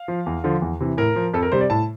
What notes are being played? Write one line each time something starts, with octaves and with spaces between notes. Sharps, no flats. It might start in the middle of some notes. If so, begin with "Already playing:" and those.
Already playing: F5
F3
E2
D3 F3
E2
C3 E3
A2 A#4
F3
F2 A4
A#4
C3 G3 C5
D5
A2 A5